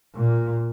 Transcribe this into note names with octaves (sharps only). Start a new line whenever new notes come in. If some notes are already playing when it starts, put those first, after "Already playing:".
A#2